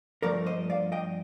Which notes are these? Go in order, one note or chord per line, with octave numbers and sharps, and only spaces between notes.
G2 F3 A3 A#4 D5
C5 D#5
D5 F5
D#5 G5